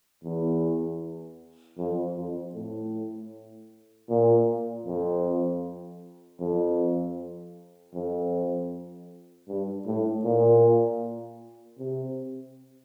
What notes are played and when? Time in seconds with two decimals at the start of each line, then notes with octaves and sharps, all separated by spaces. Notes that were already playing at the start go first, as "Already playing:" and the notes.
0.24 E2
1.78 F2
2.17 F2
2.55 A2
4.09 A#2
4.86 F2
6.40 F2
7.94 F2
9.48 G2
9.86 A2
10.24 A#2
11.78 C3